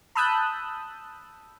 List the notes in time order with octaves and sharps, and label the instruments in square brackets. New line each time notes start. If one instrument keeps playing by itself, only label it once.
[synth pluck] A5 B5 D#6 E6 F#6 G6